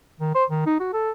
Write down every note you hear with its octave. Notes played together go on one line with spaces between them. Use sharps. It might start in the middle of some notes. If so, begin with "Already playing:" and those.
D#3
C5
D#3
D#4
F#4
A4